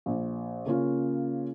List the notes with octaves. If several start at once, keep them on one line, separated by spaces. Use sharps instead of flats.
A#1
C#3 A#3 C#4 F4